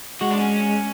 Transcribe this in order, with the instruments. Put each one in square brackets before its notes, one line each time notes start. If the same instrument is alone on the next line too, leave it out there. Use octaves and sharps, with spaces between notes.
[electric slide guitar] G#3 [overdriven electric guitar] F#4
[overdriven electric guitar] D4
C#4